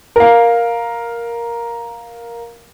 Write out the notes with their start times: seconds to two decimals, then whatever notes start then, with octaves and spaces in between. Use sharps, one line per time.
0.16 A#4 F5